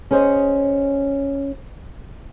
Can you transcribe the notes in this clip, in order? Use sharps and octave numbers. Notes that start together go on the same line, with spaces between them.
C#4 G#4 C5 C#5 D#5